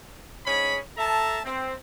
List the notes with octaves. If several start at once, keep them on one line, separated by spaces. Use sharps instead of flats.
G#2 C#4 G#4 B5
A4 E5 A5 A#5
C4